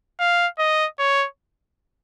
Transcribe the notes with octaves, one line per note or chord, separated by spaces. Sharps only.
F5
D#5
C#5